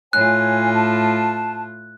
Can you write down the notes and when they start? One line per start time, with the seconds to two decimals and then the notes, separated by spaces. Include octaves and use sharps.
0.13 A2 F4 C#5 G#5 F#6
0.75 A5